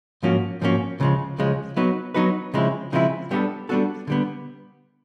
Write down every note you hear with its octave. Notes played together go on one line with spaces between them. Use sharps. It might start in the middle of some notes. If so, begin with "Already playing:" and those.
G#2 F3 A#3 C#4 F#4
G#2 F3 A#3 C#4 F#4
C#2 C#3 F3 G#3
C#2 C#3 F3 G#3
F#3 B3 D#4 F#4 B4
F#3 B3 D#4 F#4 B4
C#3 F3 G#3 C4 E4
C#3 F3 G#3 C4 E4
G3 B3 D4 F#4 A4
G3 B3 D4 F#4 A4
D3 G3 B3